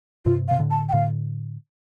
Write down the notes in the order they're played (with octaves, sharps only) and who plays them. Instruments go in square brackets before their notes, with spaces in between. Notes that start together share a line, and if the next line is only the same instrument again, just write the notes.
[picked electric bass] G2 C3 [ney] F4
[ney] F5
[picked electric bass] C3
A2 D3
[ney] A5
G5
[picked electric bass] A2 D3 [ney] F5